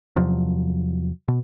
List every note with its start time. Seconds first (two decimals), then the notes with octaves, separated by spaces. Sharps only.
0.16 E2 C3 F3 F#3
1.28 B2